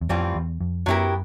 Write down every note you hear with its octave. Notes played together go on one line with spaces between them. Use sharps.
E2
F2 A2 E3 G3 C4 F4
E2
F2
F#2 F#3 B3 E4 G4 A#4